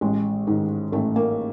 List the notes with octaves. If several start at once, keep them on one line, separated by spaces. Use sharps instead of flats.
A1 G#3
G#2 D#3
A1 A3
A#3